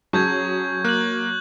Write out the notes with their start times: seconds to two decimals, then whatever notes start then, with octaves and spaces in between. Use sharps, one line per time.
0.13 F#3 C#4 G#4 A5 C#6 G6 G#6
0.85 A#3 F#6 F#7